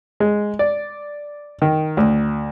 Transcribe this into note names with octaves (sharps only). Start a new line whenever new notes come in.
G#3
D5
D#3
D2